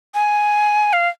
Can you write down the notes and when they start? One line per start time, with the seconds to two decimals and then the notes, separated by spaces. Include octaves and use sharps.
0.14 G#5
0.93 F5